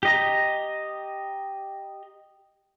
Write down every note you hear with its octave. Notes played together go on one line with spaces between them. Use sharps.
G4 D#5 A#5